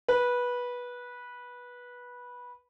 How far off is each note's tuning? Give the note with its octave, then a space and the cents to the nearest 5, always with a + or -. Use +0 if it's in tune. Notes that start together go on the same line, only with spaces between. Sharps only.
B4 -15